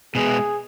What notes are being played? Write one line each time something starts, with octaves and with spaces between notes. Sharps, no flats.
B2 G#3 B3 G#4